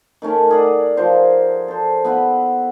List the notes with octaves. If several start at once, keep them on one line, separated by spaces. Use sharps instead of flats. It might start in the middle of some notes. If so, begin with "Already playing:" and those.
D#3 A3 C#4 A#4
G#4 D5 F#5
F3 A#4 C5
A4 C5
B3 E4